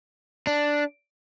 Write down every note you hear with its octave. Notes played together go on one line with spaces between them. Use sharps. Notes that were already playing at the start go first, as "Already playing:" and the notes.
D4